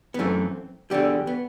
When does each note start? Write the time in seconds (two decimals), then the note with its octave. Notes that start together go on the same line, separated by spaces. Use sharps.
0.14 B3
0.19 F#2 E3 A3 C4
0.90 E2 D3 G3 G4
1.27 B3